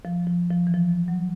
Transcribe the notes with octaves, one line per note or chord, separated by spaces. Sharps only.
F3
F3
F3
E3
F3
F#3